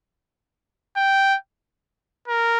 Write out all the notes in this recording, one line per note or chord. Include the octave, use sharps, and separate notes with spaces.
G5
A#4